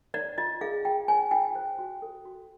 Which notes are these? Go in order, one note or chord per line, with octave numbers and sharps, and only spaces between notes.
C#5 D5
F4 D#5
G#4 F5
F4 G5
C#5 G#5
F4 G5
C5
F#4
A4
F#4